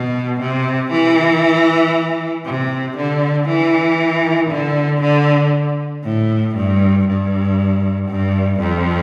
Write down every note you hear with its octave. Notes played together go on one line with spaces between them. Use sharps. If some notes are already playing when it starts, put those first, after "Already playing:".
Already playing: B2
C3
E3
C3
D3
E3
D3
D3
A2
G2
G2
G2
F2